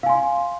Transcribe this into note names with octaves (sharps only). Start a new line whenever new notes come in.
F5 G#5 C6